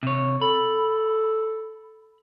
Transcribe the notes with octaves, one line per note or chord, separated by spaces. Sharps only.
C3 C#5
A4 B5